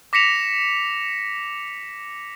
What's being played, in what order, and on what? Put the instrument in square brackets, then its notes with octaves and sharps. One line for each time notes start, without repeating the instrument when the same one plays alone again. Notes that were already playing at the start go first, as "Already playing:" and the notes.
[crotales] D6 A#6 B6 C#7 E7 F7